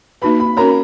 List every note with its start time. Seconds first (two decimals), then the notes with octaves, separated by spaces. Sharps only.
0.22 A#3 D#4 F#4 B4 B5
0.40 B5
0.57 C#4 F#4 A#4 C#5 A#5